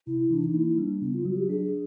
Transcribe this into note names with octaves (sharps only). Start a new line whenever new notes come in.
C3 E4
E3 D4
D#4
A#3 E4
G3 D4
C#3 B3
F4
F#3 F#4
G4
D4 G#4